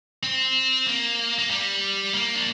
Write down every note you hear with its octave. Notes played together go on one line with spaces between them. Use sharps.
C4
A#3
A#3
G3
A#3
D4